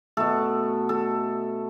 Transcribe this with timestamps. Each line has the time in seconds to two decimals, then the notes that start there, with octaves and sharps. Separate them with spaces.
0.17 B2 A3 A4
0.89 A4